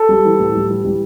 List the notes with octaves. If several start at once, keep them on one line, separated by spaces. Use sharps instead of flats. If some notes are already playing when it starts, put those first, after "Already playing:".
Already playing: A4
G3
E3
A2
G3
E3
G3